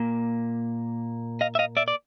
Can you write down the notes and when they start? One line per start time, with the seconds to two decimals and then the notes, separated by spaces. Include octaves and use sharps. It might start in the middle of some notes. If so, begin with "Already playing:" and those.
Already playing: A#2 A#3
1.41 D#5 F5
1.55 E5
1.59 D#5 F5
1.77 D5 E5
1.88 D5